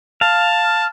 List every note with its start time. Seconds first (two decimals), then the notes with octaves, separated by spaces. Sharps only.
0.21 F5 A5